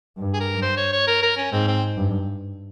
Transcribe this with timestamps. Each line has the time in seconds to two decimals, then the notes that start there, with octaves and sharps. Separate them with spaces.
0.18 G2
0.34 G#4
0.40 A#4
0.62 C5
0.77 C#5
0.92 C#5
1.07 A#4
1.22 A#4
1.37 C#4
1.52 G#2 C4
1.67 C4
1.98 G2